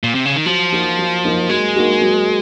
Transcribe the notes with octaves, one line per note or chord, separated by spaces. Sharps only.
A#2
C3
C#3
D#3
F3 F#3
A#3 D#4 F#4
F#3
A#3 D#4 F#4
F#3 G#3
A#3 D#4 F#4
F#3